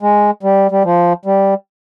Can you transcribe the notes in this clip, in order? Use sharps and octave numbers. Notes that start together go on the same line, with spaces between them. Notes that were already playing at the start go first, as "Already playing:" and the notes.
G#3
G3
G3
F3
G3